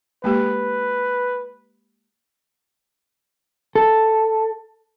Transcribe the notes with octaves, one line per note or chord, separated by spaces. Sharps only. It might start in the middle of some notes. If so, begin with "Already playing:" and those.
G#3 A#3 G4 B4
A4